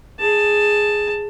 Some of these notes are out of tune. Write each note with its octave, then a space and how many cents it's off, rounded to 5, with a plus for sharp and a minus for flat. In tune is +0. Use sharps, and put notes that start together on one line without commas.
G#4 +0 A5 +5